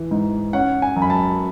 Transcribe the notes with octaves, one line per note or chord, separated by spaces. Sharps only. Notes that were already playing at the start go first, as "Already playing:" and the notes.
Already playing: E3
G#2
C#4 F#5
G#5
F#2
B5
A5